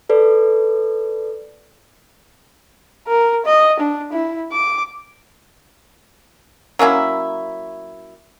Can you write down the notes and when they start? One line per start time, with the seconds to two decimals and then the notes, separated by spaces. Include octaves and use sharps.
0.09 A4 B4 D5
3.07 A#4
3.45 D#5
3.80 D4
4.12 E4
4.52 D6
6.79 F#3 A#3 C#4 E4